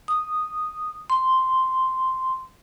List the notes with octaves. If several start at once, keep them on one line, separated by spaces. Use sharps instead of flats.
D#6
C6